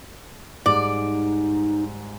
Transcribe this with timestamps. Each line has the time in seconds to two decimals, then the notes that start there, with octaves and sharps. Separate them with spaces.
0.66 G#2 G3 G#3 D#4 D5